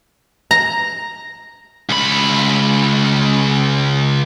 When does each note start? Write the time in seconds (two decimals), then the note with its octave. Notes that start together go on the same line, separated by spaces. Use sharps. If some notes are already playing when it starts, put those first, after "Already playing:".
0.51 A#5
1.89 C#2 B5